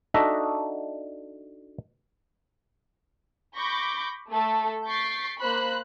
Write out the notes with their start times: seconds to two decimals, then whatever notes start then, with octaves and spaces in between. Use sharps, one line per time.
0.14 D4 D#4 F#4 A4 D#5 E5
3.56 B5 C#6 D6 G6 A#6
4.29 A3 A4
4.87 C#6 G6 A6 B6 C7 D7
5.40 A#3 C5 B5 F#6